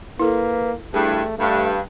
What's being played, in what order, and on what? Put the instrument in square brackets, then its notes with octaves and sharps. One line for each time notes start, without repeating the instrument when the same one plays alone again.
[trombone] A#3 [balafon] E4 A4 [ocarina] B4
[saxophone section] G2 [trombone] A3 [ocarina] E4 [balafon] G#4
[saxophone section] G2 [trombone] A3 [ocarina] F5